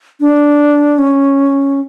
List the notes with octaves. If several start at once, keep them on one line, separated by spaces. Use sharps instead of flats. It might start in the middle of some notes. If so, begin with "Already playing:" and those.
D4
C#4